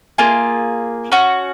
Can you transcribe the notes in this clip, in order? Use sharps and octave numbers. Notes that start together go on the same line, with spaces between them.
A#3 F4 G#4
C#4 F#4